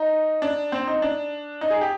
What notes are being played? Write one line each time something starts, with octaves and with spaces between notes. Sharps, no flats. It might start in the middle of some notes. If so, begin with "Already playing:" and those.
Already playing: D#4
D4
C4
D#4
D4
D#4
G#4
G4